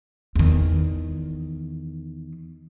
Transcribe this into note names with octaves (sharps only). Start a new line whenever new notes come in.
E2 D#3